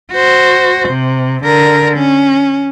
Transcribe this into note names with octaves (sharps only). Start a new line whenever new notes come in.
F#4 C5
C3
D3 A#4
C#4